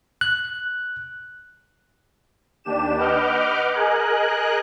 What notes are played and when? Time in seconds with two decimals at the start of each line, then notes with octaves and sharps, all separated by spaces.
0.21 F#6
2.64 D#2 D4 G4 E7
2.98 B4 D#5 F#5 D6 F6 G6
3.73 G#4 A#4 D#5 G#5 F#6